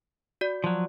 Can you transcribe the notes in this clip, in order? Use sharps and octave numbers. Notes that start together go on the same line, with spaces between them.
F#4 D5
F3 F#3